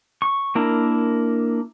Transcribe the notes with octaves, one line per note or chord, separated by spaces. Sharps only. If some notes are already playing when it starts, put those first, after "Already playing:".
C#6
A#3 D4 E4 A#4